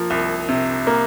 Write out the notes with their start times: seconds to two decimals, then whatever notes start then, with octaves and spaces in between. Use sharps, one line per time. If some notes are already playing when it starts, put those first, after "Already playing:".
Already playing: F3 A#3
0.10 C2
0.49 C3
0.87 A#3